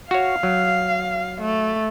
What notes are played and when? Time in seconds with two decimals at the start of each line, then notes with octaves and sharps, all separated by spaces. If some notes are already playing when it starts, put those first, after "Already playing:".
0.11 F#4 C#5 F5
0.43 F#3
1.42 A3